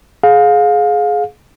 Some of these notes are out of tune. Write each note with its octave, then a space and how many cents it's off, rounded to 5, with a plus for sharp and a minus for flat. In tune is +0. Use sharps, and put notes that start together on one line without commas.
G#4 +20 F5 +25